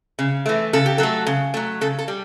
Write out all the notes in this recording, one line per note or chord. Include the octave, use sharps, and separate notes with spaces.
C#3
E3 A3
C#3 A4
G4
F#3 A3 A4
C#3
F#3 A3
C#3 A4
A4
G3